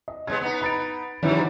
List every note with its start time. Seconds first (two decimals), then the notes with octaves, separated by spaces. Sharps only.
0.08 D#5
0.27 C3 G#3 B3 G#6
0.41 B3 D#4
0.61 B5 A6 D7
1.22 G2 D#3 E3 F#3 G3